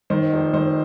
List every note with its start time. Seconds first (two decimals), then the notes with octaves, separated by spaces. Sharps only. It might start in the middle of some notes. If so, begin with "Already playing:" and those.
0.10 D#3 C5
0.33 F1
0.53 D#3 C5